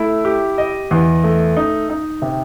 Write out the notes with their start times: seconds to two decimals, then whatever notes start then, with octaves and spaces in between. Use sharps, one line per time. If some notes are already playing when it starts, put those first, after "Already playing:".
Already playing: A3 E4
0.25 G4
0.58 D#5
0.91 E2
1.24 A3
1.57 D#4
1.90 D#4
2.22 C3